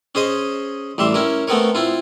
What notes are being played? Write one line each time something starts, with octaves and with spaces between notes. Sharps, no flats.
C#4 G#4 C5 D#5
A1 G3 E5 C6
C#4 E4 A#4
A3 B3 C4 A#4 C#5
C4 E4 F4